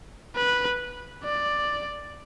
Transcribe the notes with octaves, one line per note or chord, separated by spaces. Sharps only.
B4
D5